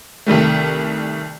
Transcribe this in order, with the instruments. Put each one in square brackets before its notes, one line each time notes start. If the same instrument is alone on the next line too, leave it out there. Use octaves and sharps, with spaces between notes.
[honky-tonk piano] C2 D#3 G3 A3